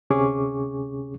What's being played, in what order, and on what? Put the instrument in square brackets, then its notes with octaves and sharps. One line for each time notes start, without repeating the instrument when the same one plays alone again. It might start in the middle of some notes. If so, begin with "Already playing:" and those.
[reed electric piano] D2 C3 C#4 G#4 C#6 D6